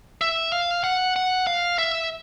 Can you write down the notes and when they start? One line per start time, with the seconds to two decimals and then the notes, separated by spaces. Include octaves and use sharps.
0.21 E5
0.52 F5
0.84 F#5
1.16 F#5
1.47 F5
1.78 E5